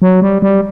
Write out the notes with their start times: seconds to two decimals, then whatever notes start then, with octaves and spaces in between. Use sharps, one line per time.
0.02 F#3
0.22 G3
0.42 G3